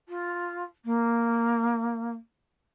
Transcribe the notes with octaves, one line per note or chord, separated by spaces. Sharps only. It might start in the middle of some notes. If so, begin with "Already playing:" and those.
F4
A#3